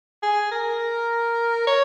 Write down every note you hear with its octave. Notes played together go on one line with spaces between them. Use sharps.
G#4
A#4
C#5